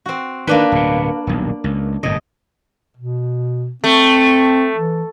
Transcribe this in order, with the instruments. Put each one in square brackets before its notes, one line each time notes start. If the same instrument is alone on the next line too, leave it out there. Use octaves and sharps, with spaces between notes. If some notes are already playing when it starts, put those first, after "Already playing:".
[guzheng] C4 F#4
[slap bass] D#3 [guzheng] A#3 D4 B4
[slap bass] D1 B2
D#1 B1
C#2
[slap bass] G1 A2 C3 [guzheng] D#5
[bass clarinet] B2
[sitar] A3 [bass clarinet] C4
[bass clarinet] E3